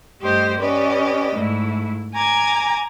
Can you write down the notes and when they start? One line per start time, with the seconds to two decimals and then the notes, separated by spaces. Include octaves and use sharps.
0.22 G2 A3 G4 C5 D#5 C6
0.59 C#4 G4 B4 D5 D#5
1.32 G#2 A3 E4
2.13 G#5 A#5 D6 G#6